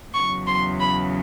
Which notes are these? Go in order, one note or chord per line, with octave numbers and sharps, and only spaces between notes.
E2 C#3 F#3 C#6
C6
B5